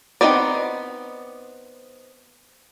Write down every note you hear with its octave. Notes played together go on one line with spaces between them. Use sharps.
B3 C4 D#4 G#4 D5